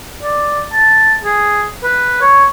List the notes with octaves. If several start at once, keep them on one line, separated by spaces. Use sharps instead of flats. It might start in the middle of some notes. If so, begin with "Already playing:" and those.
D5
A5
G#4
B4
C#5